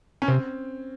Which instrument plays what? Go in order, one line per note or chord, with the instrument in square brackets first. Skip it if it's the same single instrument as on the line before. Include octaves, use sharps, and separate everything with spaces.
[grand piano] C#4
[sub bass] C3 [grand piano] C4